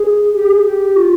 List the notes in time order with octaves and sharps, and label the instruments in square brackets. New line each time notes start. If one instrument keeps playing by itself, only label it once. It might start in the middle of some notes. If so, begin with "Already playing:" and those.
Already playing: [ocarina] G#4
G4
G#4
G4
F4